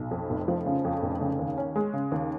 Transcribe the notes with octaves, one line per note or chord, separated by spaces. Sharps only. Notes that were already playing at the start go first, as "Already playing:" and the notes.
Already playing: B1
F2
F1
F3
C#3
F2
F1
C#3
D#2
C#4
G#3
C#3
D#2